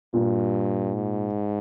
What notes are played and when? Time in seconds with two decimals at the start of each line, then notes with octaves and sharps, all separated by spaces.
0.14 G2 A#2
0.94 G#2